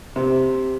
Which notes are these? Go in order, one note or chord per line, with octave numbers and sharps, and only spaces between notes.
C3